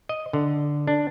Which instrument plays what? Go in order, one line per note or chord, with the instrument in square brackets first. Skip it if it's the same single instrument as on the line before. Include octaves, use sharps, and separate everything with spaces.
[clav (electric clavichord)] D#5
D3
D4